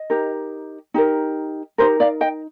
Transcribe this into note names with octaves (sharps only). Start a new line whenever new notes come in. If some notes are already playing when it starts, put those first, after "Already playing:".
Already playing: D#5
D#4 G4 A#4
D#4 G4 A#4
D#4 G4 A#4 C5
D5 F5
D#5 G5